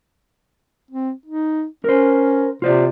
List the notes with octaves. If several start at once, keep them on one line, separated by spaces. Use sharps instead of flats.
C4
D#4
C#4 A#4 C5
C3 F4 C5 D5